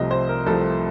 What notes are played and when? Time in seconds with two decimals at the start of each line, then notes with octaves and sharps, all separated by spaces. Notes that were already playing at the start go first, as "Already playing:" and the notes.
Already playing: C2 C3 F3 A3 D#5
0.11 C5
0.28 A#4
0.46 C2 C3 F3 A3 A4